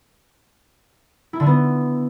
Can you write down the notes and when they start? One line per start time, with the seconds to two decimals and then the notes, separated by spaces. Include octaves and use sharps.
1.33 E4
1.40 D3
1.46 B3